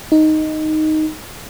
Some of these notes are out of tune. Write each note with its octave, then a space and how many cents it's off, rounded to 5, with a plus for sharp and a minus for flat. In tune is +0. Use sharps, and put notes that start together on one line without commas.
D#4 +0